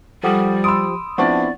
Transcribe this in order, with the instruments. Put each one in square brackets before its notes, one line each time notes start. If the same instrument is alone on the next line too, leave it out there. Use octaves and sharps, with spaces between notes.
[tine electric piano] F3 G4 [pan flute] G3 [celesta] A4 F#5 D#6
[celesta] B5 C6 D7 [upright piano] D#6 E6
[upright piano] F3 D4 [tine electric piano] B3 C4 E4 [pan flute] D5 [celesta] F#5 C#6